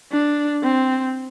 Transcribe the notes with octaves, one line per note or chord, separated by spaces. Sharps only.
D4
C4